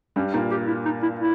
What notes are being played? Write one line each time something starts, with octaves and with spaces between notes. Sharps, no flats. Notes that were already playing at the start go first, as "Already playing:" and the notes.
G2 G3 C#4
A#2 A#3 D#4
G4
E4
D#4
E4
E4